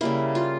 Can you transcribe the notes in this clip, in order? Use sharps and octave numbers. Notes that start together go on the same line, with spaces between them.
C#3 G3 A#3 E4
F4